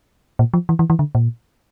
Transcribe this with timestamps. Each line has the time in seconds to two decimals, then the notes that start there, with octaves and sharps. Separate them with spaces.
0.39 A#2
0.54 F3
0.69 E3
0.79 E3
0.90 E3
0.99 D3
1.15 A#2